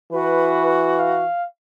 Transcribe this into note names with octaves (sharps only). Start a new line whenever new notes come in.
E3 F#4 B4
F5